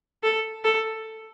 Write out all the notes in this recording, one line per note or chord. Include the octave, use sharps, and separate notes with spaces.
A4
A4